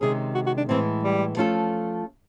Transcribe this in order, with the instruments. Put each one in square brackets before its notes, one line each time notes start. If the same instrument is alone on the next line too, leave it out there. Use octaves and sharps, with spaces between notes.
[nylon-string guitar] C3 D#3 G#3 C#4 [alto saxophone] G#4
[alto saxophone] F#4
F#4
D4
[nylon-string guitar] A2 E3 G#3 [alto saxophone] C4
[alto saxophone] G3
[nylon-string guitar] F3 A3 C#4 F4 A4